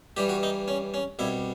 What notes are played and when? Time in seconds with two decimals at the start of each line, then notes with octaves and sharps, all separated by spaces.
0.17 G2 E3 G3 G4
0.29 F#4
0.43 D#4
0.68 C#4
0.94 C#4
1.19 C2 B2 G3 E4